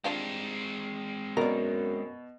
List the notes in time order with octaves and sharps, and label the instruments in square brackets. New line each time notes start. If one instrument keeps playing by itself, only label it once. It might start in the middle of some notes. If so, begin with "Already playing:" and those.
[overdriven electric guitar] G#3 C4 [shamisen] D4 F4 G4
[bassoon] F#2 [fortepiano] B2 [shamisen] A#4 D5